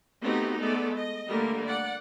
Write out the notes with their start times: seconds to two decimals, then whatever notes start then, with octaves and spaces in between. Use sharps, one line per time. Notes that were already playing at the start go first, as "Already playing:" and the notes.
0.21 A3 B3 C4 D#4 F#4 G4
0.61 G#3 A3 B3 A4 D5
0.94 D#5
1.29 D3 G3 A3 A#3 A#4
1.67 D5 F#5